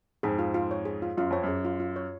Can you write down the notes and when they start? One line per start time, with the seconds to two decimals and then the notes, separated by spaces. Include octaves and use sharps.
0.23 F2 G#2 G#4
0.39 F4
0.54 F4
0.71 C#5
0.85 G#4
1.02 F4
1.17 F#2 F4
1.30 F2 C#5
1.43 F#2
1.48 G#4
1.65 F4
1.80 F4
1.96 C#5